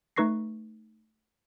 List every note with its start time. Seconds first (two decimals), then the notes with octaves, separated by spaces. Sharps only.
0.16 A3 D#4 B4 C#6 A#6 C7